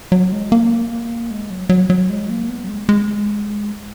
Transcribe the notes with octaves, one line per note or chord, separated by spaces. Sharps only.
F#3
G#3
A#3
G#3
F#3
F#3
F#3
G#3
A#3
B3
F#3
G#3
G#3